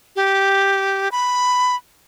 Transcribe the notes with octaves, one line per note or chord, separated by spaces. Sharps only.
G4
B5